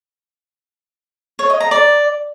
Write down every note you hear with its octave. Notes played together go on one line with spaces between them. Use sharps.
C#5
D#5
A#5
D5